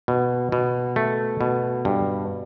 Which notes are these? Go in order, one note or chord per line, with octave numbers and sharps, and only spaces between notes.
B2
B2
A3
B2
G2